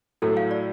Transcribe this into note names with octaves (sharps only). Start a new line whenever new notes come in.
A2 F#3 A3 A4
F5
D5